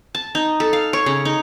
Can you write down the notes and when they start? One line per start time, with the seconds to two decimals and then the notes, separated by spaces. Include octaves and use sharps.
0.15 A5
0.35 D#4
0.60 A4
0.73 F5
0.93 C#5
1.06 C#3
1.25 D#4